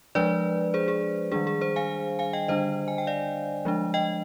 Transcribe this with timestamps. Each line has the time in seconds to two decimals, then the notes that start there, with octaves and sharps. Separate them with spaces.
0.15 F3 G#3 D4 B4 D5
0.74 G#4 C5
0.88 G#4
1.32 D#3 G3 D4 G#4
1.47 G#4
1.61 G#4 C5
1.76 F5 G#5
2.19 F5 G#5
2.33 D#5 G5
2.48 D3 G3 D4 C5 D#5
2.88 G#5
2.98 G5
3.07 D5 F5
3.65 F3 G#3 D4
3.94 D#5 G5